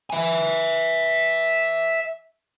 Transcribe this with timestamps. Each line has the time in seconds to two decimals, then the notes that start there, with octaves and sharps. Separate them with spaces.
0.10 E5 G#5